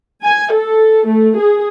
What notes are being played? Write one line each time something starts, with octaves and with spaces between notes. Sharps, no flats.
G#5
A4
A3
G#4